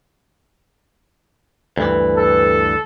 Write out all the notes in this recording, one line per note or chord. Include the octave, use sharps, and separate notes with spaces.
D2 G2 E3 B4
A4